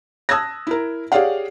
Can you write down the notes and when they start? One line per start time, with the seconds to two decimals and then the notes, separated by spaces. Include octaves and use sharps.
0.29 A5 D#6 E6 F#6 G#6 A#6
0.67 E4 A#4
1.12 G4 G#4 C#5 D5 F5 F#5